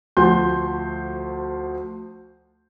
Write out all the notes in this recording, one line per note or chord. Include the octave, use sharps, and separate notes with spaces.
D2 F3 F#4 C6 G6